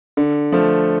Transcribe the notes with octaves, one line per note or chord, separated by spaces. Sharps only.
D3
F3 A3